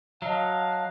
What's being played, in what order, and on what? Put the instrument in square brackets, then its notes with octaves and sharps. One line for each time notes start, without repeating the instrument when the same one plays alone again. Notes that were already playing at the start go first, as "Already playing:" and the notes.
[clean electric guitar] F#3 [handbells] D#5 A#5 [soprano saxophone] F5 [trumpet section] F#5 A5